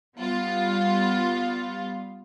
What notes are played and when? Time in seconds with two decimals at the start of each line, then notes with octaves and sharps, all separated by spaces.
0.16 G3 B3 F4